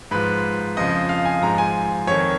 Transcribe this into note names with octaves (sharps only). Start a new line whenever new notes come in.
G#2 F3 B4
F2 C#3 F3 D#5
F5
G#5
G#2 F3 A#5
G#5
F2 D#3 C#5